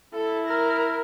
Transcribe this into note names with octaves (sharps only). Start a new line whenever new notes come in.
E4 A4
A#4